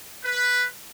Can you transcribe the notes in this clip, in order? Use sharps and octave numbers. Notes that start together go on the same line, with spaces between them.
B4